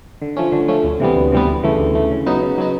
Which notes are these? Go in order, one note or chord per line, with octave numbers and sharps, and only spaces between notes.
D3
F3 A3 C#4
D3
F3 A3 C#4
D2
C3 E3 G3 B3
D2
C3 E3 G3 B3
D2
C#3 E3 A3
D2
C#3 E3 A3
C#3
F#3 B3 D#4
C#3
F#3 B3 D#4